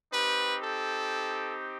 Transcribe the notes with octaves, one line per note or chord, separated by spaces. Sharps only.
C4 D#4 G4 B4
A4